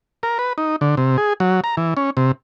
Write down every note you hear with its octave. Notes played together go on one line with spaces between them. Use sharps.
A#4
B4
D#4
D3
C3
G#4
F#3
A#5
E3
C#4
C3